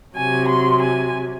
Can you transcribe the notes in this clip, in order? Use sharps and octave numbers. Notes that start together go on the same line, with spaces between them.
C3 F#3 G#5
C6
G#5